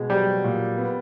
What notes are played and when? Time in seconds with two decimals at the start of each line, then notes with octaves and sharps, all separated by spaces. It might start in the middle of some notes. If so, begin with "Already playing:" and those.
Already playing: B2 G#3
0.09 F#3 G3
0.44 A#2
0.78 B3